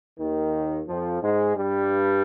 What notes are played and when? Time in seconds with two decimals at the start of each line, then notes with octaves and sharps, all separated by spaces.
0.19 D#2 D#3
0.87 F2 F3
1.21 G#2 G#3
1.55 G2 G3